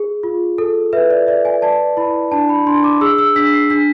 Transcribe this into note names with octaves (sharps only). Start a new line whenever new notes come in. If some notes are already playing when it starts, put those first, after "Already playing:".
Already playing: G#4
F4
A4
B4 E5
D5
D5 E5
G#5
D5 A5
E4 B5
D4 A5
B5
D4 C6
D6
G#4 E6
E6
D4 B6
C7
D4 B6